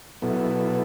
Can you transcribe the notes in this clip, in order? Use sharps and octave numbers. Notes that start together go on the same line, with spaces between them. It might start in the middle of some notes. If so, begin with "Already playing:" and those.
B2 F#3 B3 E4 A4